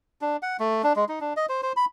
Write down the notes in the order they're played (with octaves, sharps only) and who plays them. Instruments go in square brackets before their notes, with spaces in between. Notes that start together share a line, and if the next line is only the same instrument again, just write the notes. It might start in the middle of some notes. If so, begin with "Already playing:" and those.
[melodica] D4
F#5
A3
D4
G#3
D#4
D4
D#5
C5
C5
B5